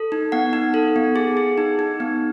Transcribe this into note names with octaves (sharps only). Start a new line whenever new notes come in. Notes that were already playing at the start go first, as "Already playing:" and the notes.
Already playing: A4
D#4
B3 F#5
D#4
A4
B3
G#4
G#4
D#4
D#4
B3